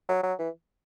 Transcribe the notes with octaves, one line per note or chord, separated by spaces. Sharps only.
F#3
F#3
E3